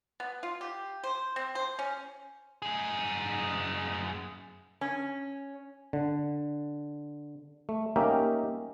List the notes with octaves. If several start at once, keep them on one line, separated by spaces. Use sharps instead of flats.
B3
F4
G4
C5
C4
C5
C#4
F#2 G#4
C#4
D3
A3
A#3 C#4 D#4 G4 A#4 E5